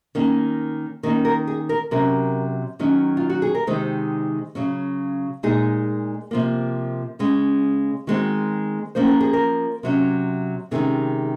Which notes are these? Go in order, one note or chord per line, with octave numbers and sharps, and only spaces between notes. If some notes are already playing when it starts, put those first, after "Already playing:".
D#3 A#3 C#4
D#3 A#3 C#4 A#4
A#4
G#4
A#4
C3 F#3 C#4 A#4
D#3 F#3 C#4
F4
F#4
G#4
A#4
C3 D#3 G#3 D#4 C5
C#3 F#3 C#4
A#2 G#3 D#4 G#4
C3 F3 A#3
C#3 G#3 C#4
D#3 G#3 C4 F#4
F3 A#3 C#4 C5
A#4
G#4
A#4
C3 F#3 C#4
C3 D#3 G#3 C#4 G#4